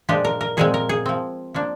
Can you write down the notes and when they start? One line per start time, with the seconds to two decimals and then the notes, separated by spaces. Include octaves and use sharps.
0.09 A#2 F3 G#3 D4 G4
0.25 A#4
0.41 A#4
0.57 A#2 F3 G#3 C4 G#4
0.74 A#4
0.89 G#4
1.06 F3 C4
1.54 F3 A#3 D4